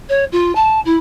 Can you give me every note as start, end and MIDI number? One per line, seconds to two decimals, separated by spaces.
0.09 0.24 73
0.32 0.54 65
0.55 0.79 81
0.85 0.96 64